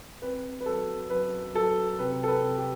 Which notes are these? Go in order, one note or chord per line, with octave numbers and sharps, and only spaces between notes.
C4 B4
B4
F#3 A4
F#2 B4
F#3 A4
C3 B4
A4
B4
C3
G4